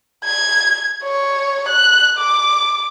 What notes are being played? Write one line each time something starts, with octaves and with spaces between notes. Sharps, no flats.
G#6
C#5
F#6
D6